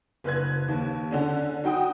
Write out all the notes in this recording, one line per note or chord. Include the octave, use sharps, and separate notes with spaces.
F#1 B4 F#6 G#6
D#2
D3 C#4 D4
D#4 F#4 G5 D#6